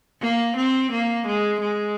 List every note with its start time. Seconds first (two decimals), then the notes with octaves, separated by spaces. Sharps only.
0.21 A#3
0.56 C4
0.92 A#3
1.27 G#3
1.61 G#3